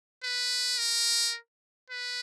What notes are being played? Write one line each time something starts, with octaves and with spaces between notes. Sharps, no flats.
B4
A#4
B4